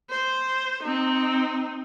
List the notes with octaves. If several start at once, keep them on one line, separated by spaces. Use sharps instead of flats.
C5
C4 D#4